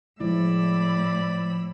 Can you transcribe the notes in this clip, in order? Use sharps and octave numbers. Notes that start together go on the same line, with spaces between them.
A2 F3 G#3 E4 D5 B5 E6